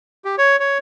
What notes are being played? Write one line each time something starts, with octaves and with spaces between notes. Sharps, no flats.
G4
C#5
C#5